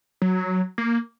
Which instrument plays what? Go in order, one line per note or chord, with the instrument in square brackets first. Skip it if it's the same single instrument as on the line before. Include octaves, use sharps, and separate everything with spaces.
[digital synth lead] F#3
A#3